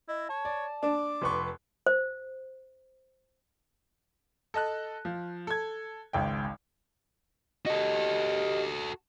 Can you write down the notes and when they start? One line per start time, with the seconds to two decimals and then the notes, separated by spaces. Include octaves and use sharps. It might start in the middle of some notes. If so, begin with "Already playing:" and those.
0.08 E4 D#5
0.29 C#5 A5
0.45 D5
0.83 D4 D6
1.21 F1 B4 C6 C#6
1.87 C5
4.54 A4 D#5 A5 F#6
5.05 F3
5.47 A4 G#6
6.13 G#1 C#2 G5
7.66 F#4 G4 A4 D#5